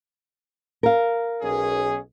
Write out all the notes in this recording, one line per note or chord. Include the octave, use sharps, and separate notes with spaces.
A#4 F5
B1 C#4 G#4